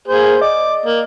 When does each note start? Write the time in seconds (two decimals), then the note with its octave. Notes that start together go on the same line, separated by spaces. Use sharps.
0.08 A#3 G#4 C5
0.41 D5 D#5 D6
0.86 A#3